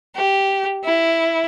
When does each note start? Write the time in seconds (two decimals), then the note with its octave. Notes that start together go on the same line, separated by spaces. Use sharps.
0.17 G4
0.84 E4